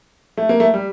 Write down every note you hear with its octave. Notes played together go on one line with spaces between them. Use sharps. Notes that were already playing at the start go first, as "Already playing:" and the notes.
A3
A#3
A3
G3